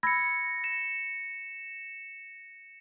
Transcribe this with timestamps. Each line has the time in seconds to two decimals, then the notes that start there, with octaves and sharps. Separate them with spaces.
0.03 B5 E6 G#6 A#6 C#7
0.64 A#6 E7